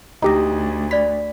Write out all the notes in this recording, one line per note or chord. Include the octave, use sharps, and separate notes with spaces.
D2 D#4 G4 D#5
D5 B5 B6